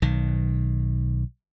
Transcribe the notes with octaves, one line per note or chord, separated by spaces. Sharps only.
B1 D#3